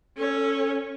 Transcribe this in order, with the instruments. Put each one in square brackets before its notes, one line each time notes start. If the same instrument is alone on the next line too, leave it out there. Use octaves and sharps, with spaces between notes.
[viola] C#4 C#5 [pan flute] A4